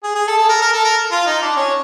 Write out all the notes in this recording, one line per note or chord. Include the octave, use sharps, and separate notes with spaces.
G#4
G#4
A4
A4
A#4
A#4
A4
A#4
F4
D#4
D4
C#4